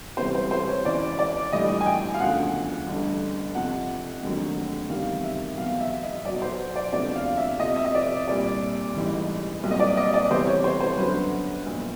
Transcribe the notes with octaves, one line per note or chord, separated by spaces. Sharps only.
C#2 C3 E3 G3 C5
C5
C5
C#5
C#2 C#3 E3 D5
D5
A#1 A2 E3 G3 D#5
G#5
G5
F5
E1 D2 C#3 F3 F#5
A1 G2 D3
F2 C3 F3 F#5
F1 D#2 D3 F#3
E2 C3 D#3 G3 F5
E5
E2 B2 F#3 F5
E5
D#5
B1 B2 F#3 D5
C5
D5
E1 D2 C3 F3 D5
F5
E5
F2 C3 F3 D#5
E5
D#5
D5
C2 A#2 G3 D5
A1 G#2 E3 G3
C2 A#2 F#3
D#5
D5
D#5
D5
E2 C3 E3 G3 C5
C#5
C5
C5
G1 F#2 D3 F#3 B4
B1 A#2 F3